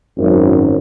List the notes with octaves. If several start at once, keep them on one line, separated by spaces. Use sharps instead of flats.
G#1 F#2